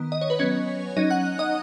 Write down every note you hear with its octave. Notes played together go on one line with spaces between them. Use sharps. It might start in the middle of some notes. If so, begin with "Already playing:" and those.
Already playing: D#3 B3
D#5
C#5
B4
F#3 B3 C#4 C#5
F#3 C#4 D#4 D#5
F#5 F#6
D#5 D#6